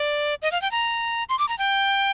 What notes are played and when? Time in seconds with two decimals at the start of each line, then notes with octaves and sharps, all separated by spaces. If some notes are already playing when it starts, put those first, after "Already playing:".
Already playing: D5
0.42 D#5
0.52 F5
0.62 G5
0.71 A#5
1.29 C6
1.39 D6
1.48 A#5
1.58 G5